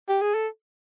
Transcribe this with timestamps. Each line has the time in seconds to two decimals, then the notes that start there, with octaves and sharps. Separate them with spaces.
0.09 G4
0.21 G#4
0.34 A4